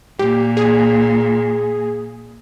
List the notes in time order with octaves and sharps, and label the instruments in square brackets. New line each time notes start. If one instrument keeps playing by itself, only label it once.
[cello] A#2 [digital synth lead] G4
[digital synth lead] G#4